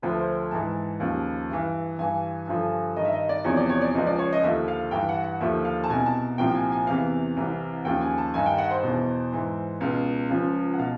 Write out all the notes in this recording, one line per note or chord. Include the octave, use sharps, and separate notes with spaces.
D2 D3 F3 B4
C5
G#2 E3 A5
D#2 C#3 F3
G2 E3
G2 E3 G#5
G2 D3 F3
G2 D#3 D#5
E5
D#5
D5
E2 C3 F3 C#5
D5
C#5
D5
C#2 C#3 F3 D#5
D5
C#5
D#5
D#2 D3 F3 E5
F5
G2 E3 G5
F#5
F#5
D#2 D3 F3 E5
F5
A5
C2 B2 G#5
A5
C2 A#2 F3 G5
G#5
G#5
E2 C3 E3 F5
C2 C3 E3
D#2 C#3 F3 G5
G#5
A5
G2 D#3 G#5
G5
F#5
C5
E2 B2
G#2 E3
C#2 B2 F5
C#2 C#3 F3
F#5
B2 F5